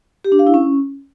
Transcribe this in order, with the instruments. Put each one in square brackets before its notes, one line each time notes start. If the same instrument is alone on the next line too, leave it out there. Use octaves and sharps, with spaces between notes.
[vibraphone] G4
D4
F5
E4
C#4